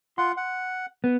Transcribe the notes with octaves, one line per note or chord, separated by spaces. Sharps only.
F4 F#5 C6
F#5
B3